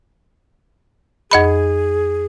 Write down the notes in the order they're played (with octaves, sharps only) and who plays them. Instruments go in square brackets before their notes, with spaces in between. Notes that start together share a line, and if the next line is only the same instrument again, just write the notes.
[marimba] F2 D#5 B5 [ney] G#4